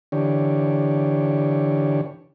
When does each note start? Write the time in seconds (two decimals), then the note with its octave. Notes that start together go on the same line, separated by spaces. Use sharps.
0.12 D3 E3 D4 G4 C#5